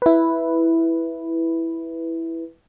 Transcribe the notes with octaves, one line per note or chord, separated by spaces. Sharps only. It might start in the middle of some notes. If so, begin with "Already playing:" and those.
E4 B4